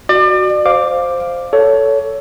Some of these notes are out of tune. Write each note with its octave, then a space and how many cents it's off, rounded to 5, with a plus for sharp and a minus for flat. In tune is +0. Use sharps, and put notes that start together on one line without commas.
F#4 +0 D5 +35
C5 +0 F5 +0 D6 +5
A4 +0 C#5 +20